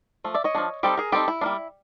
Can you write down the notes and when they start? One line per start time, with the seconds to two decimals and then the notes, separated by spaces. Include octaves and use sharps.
0.24 F3 A3
0.34 D5 E5
0.44 C#5 D#5
0.55 A3 D4
0.58 F3
0.83 G3 C4 D#4 G4 A4
0.97 G#4 A#4
1.12 G3 C4 D#4 G4 A4
1.28 E4
1.41 G3 A#3 D4